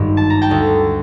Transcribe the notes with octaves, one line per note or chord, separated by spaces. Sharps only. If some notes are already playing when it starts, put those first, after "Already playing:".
Already playing: G#1 G2 D#3
A5
A#5
G5 A5
D2 D3